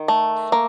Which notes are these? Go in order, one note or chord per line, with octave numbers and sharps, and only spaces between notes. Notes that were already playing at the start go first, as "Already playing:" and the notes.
Already playing: D#3
A3
A#3